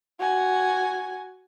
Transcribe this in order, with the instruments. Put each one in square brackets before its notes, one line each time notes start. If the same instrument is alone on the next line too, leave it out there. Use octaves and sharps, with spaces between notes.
[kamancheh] F#4 G#5